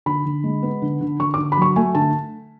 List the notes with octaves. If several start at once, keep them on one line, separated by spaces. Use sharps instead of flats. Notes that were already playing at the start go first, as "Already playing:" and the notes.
D3 B5
D3
G#3
B3
D3
D3
D3 C#6
D3 D6
B5
F#3 C#6
A3 G#5
D3 A5